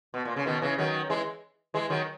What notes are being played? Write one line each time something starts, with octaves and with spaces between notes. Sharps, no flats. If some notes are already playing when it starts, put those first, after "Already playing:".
B2
A#2
C#3
B2 D#3
C#3 E3
D#3 F#3
E3 G#3
E3 G#3
D#3 F#3